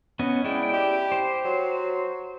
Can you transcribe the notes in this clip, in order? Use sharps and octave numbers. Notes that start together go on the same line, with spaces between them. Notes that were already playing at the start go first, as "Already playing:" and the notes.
B3 C#4 D#5
G#3 E4 D5 G5
G4
C5
F#3